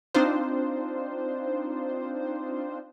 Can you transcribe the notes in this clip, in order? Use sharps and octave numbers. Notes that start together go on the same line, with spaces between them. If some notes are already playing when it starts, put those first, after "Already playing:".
C4 D4 D#4 F4 C5